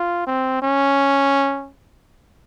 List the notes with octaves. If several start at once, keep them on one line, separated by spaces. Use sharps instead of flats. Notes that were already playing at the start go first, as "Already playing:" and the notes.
Already playing: F4
C4
C#4